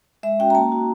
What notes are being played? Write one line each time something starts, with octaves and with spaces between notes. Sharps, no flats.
G#3 E5
C#4 F#4 G5
A#5
A#3 A5
D#4 F#4